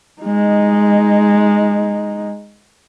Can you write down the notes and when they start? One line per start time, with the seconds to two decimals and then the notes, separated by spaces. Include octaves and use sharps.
0.22 G#3 D#4